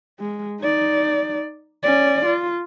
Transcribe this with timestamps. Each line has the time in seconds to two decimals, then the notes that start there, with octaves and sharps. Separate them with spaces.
0.19 G#3
0.60 D#4 D5
1.83 C#4 D5
2.26 F4